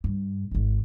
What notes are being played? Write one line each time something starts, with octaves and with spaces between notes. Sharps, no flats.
G2
G#1 D#3